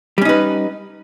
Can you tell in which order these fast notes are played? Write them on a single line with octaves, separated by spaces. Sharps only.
G3 C#4 D#4 B4